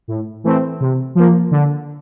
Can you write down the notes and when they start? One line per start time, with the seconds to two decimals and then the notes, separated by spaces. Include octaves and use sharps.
0.08 A2
0.44 E3 A3 C4
0.80 C3
1.15 F3 A#3
1.51 D3